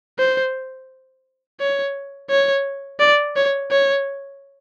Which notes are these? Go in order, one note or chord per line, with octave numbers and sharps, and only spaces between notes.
C5
C#5
C#5
D5
C#5
C#5